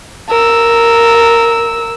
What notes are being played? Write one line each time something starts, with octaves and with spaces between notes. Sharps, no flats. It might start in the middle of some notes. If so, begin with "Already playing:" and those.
A#4 E6